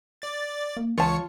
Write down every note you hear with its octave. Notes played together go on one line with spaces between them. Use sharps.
D5 A6
A#3
C#2 E3 F4 C#5 A5 C#7